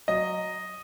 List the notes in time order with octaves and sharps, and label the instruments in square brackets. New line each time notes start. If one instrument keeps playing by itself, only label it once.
[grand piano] F#3 D#5